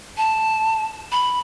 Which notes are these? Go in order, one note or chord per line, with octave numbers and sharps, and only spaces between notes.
A5
B5